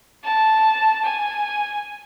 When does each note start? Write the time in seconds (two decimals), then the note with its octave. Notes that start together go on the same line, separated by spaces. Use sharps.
0.25 A5
1.05 G#5